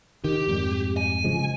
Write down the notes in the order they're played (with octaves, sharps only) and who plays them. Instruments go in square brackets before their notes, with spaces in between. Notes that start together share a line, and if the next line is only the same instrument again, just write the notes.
[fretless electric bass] D#3 [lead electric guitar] G4
[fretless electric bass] F2 G#2 G3
[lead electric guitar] G#5
[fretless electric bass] C#3 F3 G#3